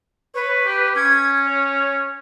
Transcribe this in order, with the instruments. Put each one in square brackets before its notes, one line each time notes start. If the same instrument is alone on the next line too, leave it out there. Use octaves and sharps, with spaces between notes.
[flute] B4 [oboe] C#5
[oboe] G4
[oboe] C#4 [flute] G#6
[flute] C#5